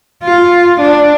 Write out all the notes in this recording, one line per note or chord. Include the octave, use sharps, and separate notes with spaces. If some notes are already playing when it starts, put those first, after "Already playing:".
F4
D4